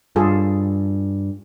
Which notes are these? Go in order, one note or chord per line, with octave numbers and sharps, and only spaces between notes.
G2 F4 G#4 A4